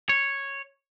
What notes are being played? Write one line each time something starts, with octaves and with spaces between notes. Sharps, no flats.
C#5